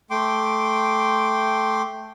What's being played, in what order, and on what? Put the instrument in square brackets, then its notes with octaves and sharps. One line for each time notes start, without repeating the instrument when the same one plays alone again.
[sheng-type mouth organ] A3 G5 C6 D6